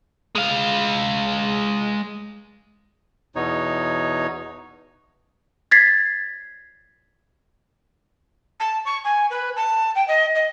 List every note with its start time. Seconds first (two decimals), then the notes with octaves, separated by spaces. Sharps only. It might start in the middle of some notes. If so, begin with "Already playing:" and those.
0.35 G#3 F5
3.36 E2 B2 D#4 C#5
5.71 G#6 A6 B6 C7
8.60 A5
8.85 C#6
9.04 G#5
9.30 B4
9.56 A5
9.95 G5
10.08 D#5
10.35 D#5